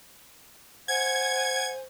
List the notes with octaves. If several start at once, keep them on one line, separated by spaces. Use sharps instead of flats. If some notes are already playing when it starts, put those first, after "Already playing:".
C5 F#5 G#5 G#6